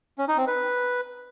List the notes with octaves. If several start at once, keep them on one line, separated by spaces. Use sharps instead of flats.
C#4
D#4
C4
B4